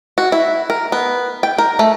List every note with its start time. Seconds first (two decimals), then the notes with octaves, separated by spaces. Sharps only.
0.18 F#4
0.32 E4
0.70 A#4
0.92 B3
1.43 G5
1.58 A#4
1.79 A3